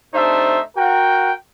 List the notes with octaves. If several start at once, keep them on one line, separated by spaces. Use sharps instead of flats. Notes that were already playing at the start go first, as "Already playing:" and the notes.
C3 A3 D4 D#4 C5 E5
F#4 A#4 F#5 G5